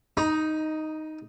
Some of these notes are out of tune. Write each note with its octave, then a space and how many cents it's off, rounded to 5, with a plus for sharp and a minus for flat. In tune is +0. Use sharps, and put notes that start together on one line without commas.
D#4 +0 A#5 +35